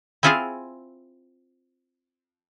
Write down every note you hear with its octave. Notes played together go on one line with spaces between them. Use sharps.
C4 E4 F4 G#4 C5 F5